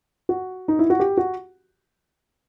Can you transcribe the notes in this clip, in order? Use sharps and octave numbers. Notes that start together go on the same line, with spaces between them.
F#4
D#4
E4
F#4
G4
F#4